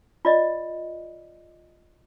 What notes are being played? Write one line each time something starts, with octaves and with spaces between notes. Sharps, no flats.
F4 D5 D#5